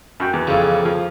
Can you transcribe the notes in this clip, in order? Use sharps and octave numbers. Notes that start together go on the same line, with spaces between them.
F#2 F#4 G5
E2
F2 C#3
F3